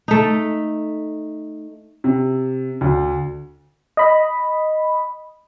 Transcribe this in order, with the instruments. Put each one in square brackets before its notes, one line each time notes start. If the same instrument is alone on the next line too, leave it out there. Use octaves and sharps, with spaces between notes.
[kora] A3 D#4
[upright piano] C3
D2
[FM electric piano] D#5 B5